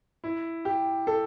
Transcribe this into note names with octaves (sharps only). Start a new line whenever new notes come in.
E4
G4
A4